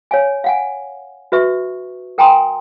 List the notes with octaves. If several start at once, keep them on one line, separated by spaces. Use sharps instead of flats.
C#5 F5 G#5
F5 F#5 G#5
F#4 B4 E5 C#6
A#4 G5 G#5 A#5 C6 D#6